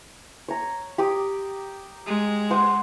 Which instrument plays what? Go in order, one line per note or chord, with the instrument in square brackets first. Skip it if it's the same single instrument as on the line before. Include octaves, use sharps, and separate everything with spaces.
[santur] C#5 A#5
G4 D6 D#6
[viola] G#3
[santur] C5 F#5